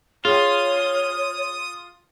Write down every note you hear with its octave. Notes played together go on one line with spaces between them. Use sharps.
F4 G#4 C#5 G5 D#6